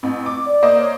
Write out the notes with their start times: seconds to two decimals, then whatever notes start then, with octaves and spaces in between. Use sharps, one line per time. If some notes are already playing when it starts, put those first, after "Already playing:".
0.03 A1 C4
0.26 D6
0.46 D5
0.63 A#3 C5 D#5
0.80 C#5